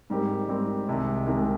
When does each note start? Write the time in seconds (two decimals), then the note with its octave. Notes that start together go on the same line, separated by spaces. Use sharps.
0.10 G#2 G3 C4 G4 A#4
0.48 G#2 G3 C4 G4 A#4
0.87 C2 C3 D#3 G#3
1.26 C2 C3 D#3 G#3